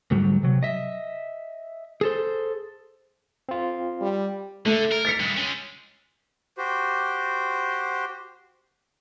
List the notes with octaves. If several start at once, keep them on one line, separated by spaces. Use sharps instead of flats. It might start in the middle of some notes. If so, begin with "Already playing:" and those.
D2 G#2 F#3 G3
C3 F#3
D#5 E5
G#4 A4 C5
C4 F4
G3
D3 A3
A#4
A6 B6 C#7
G2 G#3
G#3 C#4
F#4 G4 C5